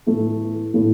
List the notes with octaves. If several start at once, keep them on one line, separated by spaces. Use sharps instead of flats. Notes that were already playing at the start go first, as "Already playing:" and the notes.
A2 E3 A3
A2 E3 A3